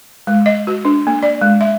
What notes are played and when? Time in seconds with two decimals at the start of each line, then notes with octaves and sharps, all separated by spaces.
0.27 G#3
0.46 D#5
0.67 F#4
0.85 D4
1.07 A#3
1.23 D5
1.41 G#3
1.61 E5